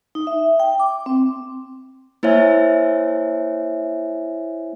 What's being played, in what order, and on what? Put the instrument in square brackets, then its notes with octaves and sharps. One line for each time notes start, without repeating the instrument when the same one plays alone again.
[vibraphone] D#4
E5
G5
D6
C4
[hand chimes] A#3 E4 C5 C#5 E5 G#5